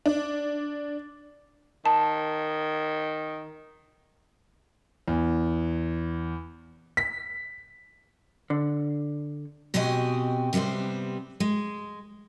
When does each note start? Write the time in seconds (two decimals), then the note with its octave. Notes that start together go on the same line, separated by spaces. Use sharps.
0.06 D4
1.86 D#3 A5
5.08 E2
6.97 B6
8.50 D3
9.74 B2 C4 F#4 G4 D#5 G#5
10.53 C3 G3 B3 C4 C5
11.40 G#3